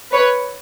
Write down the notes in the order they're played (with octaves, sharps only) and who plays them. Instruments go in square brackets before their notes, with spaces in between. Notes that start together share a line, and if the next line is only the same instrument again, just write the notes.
[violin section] B4 C#5